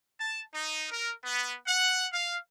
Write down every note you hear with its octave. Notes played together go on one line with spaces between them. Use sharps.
A5
D#4
A#4
B3
F#5
F5